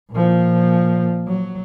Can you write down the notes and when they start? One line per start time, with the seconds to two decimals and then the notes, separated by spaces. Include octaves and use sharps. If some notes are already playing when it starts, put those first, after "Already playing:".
0.11 A#2 F3
1.27 F#3